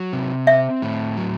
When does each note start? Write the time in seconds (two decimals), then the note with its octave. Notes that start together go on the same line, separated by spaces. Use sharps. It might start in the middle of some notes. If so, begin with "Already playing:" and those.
Already playing: F#3
0.13 C3
0.47 C4 E5
0.82 A2
1.17 F#3